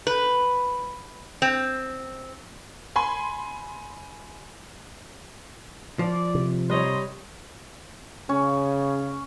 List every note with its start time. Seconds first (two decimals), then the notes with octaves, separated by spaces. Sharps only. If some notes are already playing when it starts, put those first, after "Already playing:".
0.07 B4
1.42 C4
2.96 G#5 B5 C6
5.99 F3 D5
6.35 C3
6.70 G3 D#4 C#5 D#5 C6
8.29 C#3 C#4